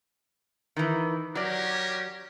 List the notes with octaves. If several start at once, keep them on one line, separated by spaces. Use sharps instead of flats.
D#3 E3
F#3 C#4 G4 A#4 D5